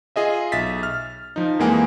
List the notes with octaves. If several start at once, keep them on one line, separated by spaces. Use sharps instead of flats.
F4 G#4 D#5 E5
B1 E5 A6 B6
F6
F3 D#4
F2 E3 G#3 A#3 F#5 G#5